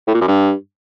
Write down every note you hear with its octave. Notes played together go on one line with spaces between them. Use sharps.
A2
A#2
F#2
G2